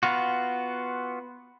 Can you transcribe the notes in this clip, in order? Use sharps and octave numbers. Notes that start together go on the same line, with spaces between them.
B3 F4 F#4